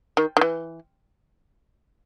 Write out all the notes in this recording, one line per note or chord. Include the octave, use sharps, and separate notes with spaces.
D#3
D#3
E3